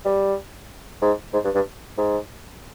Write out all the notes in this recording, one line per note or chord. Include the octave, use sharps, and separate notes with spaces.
G3
G#2
G#2
G2
G2
G#2